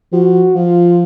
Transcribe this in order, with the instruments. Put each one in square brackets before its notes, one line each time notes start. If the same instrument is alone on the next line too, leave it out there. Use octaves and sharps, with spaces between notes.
[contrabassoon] F3 [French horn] F#4
[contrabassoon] F3 [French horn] F4